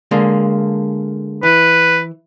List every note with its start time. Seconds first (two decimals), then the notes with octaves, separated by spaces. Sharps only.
0.11 D3 G#3 A#3
1.43 E3 B4